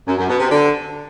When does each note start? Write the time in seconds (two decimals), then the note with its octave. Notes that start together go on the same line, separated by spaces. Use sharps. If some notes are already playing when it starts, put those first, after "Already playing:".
0.07 F#2
0.18 F#2
0.29 B2
0.40 C3
0.51 D3